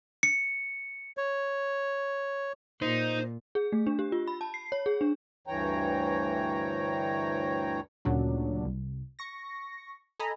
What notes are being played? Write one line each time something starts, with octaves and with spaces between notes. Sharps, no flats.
C#7
C#5
A#2 D#4 C5
G#4
A3
D4
G4
F4
B5
A5
C7
C#5
G#4
D4
D2 G2 E3 C#5 G5 A#5
D2 A#2 C#3 F#3 D4
C2
C#6 A#6
A4 D#5 G#5 A#5 B5